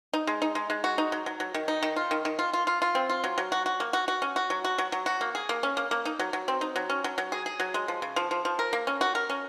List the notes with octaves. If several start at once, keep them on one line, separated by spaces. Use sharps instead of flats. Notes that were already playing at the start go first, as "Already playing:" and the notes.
D#4
G#3
D#4
G#3
G#3
F#4
D#4
F#3
F#3
F#3
D#3
D#4
D#3
F4
D#3
D#3
F4
F4
F4
F4
C4
F4
F#3
F#3
F#4
F#4
A#3
F#4
F#4
C#4
F#4
F#3
F#4
F#3
F#3
F#4
A#3
G#4
A#3
C#4
A#3
A#3
D#4
F#3
F#3
C4
D#4
F#3
C#4
F#3
F#3
G#4
G#4
F#3
G#3
F3
C#3
F3
F3
F3
A#4
A#3
C#4
F#4
A#4
C#4